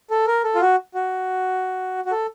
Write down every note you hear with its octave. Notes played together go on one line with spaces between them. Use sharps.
A4
A#4
A4
F4
F#4
F#4
F#4
A4